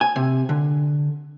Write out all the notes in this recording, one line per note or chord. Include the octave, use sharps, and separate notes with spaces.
G#5
C3
D3